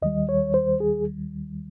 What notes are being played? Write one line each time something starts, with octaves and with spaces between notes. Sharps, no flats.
D#2 D#3 G3 D#5
C#5
C5
G#4